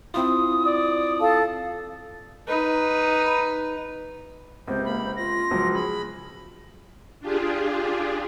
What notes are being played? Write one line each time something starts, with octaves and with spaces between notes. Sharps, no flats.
C4 E4 F4 D#6
D5
A4 F5 A5
D#4 B4
C#2 C3 C5
A#3 B5
C5
F4 A#6
C#2 F3 F#3
G#4 B5
D4 F4 G4 G#4